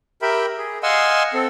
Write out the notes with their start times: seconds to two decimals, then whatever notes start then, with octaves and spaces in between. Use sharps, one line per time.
0.22 G4 A#4 E5 G5 B5
0.58 G#4
0.83 D#5 F5 F#5 G#5 C6 E6
1.34 C4 A4